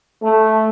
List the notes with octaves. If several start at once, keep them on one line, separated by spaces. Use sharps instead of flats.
A3